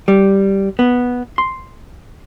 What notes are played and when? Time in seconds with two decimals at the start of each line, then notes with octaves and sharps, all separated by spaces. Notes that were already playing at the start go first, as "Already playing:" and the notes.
0.08 G3
0.79 B3
1.38 C6